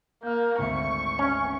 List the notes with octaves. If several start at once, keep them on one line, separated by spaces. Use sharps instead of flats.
A#3 F6 G6
G#1 D2 E5 C#6
C#4